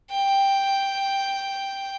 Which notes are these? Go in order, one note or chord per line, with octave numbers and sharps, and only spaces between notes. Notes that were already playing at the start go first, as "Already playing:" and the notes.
G5